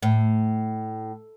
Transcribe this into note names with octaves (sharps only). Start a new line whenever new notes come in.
A2